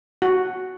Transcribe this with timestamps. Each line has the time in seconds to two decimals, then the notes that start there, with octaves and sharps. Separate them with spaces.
0.22 F#4